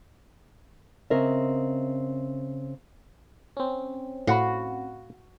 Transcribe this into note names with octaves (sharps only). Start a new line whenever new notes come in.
C#3 C4 A#4 D#5 E5
C4 C#4
A2 F#4 F5 F#5 B5